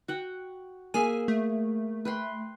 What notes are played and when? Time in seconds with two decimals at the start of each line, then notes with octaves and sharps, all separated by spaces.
0.08 F#4 F#5 G5
0.94 A#3 G#4 E5 G#5
1.28 A3
2.05 B4 G5 C6